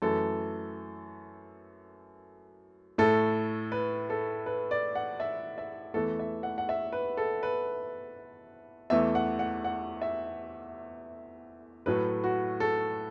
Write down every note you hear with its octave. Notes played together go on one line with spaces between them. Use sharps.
F#2 E3 A3 A4
A2 A3 A4
B4
A4
B4
D5
F#5
E5
E5
E2 E3 A3 A4
E5
F#5
F#5
E5
B4
A4
B4
E2 E3 A3 E5
F#5
F#5
F#5
E5
A2 F#3 A3 B4
F#4
A4